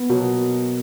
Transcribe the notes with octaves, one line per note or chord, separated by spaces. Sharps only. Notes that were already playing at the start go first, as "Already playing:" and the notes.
Already playing: B3
B2 F#3 A#3